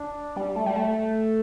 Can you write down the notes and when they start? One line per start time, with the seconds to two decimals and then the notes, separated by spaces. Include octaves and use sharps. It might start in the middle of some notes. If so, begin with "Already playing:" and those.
Already playing: D4
0.36 G3
0.56 A3
0.66 G3
0.76 A3